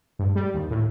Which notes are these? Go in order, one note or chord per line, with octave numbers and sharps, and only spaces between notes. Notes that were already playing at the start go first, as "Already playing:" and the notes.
G2
G3
D#2
A2